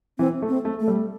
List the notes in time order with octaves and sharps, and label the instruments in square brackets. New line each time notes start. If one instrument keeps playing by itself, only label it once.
[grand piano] E3 [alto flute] C4
[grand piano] A3
[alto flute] C4
[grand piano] A3
[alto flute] A3
[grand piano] G3